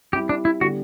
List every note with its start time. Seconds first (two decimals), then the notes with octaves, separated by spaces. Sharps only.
0.13 G3 C4 E4 G4
0.29 D4
0.45 E4
0.61 D3 G3 B3 F#4